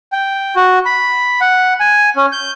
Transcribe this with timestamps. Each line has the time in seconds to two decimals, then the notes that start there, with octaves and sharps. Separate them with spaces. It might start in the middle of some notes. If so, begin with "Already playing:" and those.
0.12 G5
0.56 F#4
0.86 B5
1.41 F#5
1.80 G#5
2.16 C#4
2.32 G6